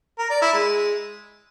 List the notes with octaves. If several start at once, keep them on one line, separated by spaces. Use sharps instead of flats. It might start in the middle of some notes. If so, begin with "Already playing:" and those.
A#4
D5
E4
G#3